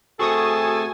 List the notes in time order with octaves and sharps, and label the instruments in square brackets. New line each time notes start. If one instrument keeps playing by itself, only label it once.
[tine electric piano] A3 C4 G#4 [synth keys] F#4 C#6 D#6 [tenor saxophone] A4 [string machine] G#5